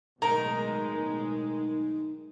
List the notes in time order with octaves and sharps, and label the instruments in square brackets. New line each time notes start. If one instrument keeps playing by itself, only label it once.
[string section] B1 A2 G#3 [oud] D#3 [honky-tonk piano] A#5